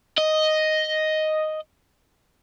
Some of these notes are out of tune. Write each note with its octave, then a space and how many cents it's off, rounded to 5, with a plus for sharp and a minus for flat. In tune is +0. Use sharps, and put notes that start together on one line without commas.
D#5 +0